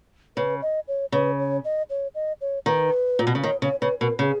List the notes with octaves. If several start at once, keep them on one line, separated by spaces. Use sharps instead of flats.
C#3 B4
D#5
C#5
C#3 B4
C#5
D#5
C#5
D#5
C#5
D#3 B4
A#2
B2
C#3
D#3 C#5
C#3 C#5
C#3 B4
B2 A#4
C#3 G#4